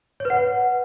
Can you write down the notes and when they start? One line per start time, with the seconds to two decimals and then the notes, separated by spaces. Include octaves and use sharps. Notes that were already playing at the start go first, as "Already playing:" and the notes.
0.20 C#5
0.25 B4
0.30 F#5